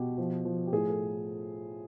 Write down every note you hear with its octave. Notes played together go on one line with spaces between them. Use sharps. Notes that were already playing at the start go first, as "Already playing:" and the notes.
Already playing: B2 G4
F3
F3
G4
A2 G#4
A4